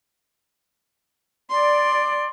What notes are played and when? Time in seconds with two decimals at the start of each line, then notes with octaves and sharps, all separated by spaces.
1.50 D5 C6